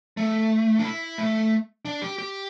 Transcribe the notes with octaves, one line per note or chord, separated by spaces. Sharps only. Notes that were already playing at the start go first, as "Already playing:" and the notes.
A3
D4
E4
A3
D4
G4
G4